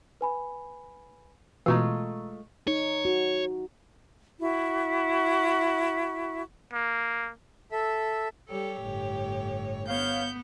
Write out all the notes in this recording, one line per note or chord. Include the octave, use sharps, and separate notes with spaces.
B4 G#5 B5
B2 E3 G#3 A3 F4 A#5 C#6 E6
D#4 C#5
F#4
E4 F#4
A#3
A4 E5
G3 G4 A4 C#5
G1 A2
B3 C#5 F5 G6